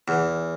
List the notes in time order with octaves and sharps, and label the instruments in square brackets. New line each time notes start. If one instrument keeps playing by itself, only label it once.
[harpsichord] E2